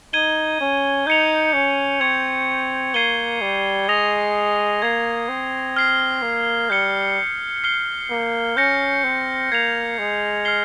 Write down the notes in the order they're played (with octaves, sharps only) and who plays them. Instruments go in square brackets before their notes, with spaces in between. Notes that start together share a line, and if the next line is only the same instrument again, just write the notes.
[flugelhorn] D#4 [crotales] G#6 D#7 G7
[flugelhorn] C#4
[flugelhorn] D#4 [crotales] G6 C#7 F7
[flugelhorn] C#4
[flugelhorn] C4 [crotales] C#6 G#6 C#7 F7
[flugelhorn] A#3 [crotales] G#6 C7 D#7 G7
[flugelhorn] G3
[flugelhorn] G#3 [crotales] D#6 A#6 F7
[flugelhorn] A#3 [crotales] G#6 C7 F7
[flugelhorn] C4
[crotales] F6 C7 G7
[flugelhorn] A#3
[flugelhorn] G3 [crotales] G6 C#7 G7
[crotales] F6 C7 G7
[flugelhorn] A#3
[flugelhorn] C#4 [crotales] G6 A#6 C#7
[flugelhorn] C4
[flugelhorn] A#3 [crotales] G#6 C7 F7
[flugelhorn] G#3
[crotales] F6 C7 G7